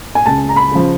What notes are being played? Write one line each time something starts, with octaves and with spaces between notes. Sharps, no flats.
G#5
C#2 A5
A#5
B5
C#3 F3